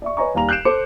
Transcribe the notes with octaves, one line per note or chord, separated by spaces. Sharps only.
D5 E5 C#6
B4 C#5 D#5 G#5 A#5 C#6
D#2 G3 F5 G#5 A#5 F7
F#6 G6 C7 D7 E7
A4 C5 D6 C#7